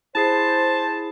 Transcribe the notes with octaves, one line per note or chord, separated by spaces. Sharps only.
E4 G#4 C5 A5 C7